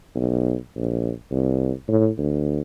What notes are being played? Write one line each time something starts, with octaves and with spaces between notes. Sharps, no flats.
B1
A#1
C2
A2
D2